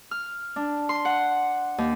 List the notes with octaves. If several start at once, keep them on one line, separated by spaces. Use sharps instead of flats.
F6
D4
C6
F#5
D#2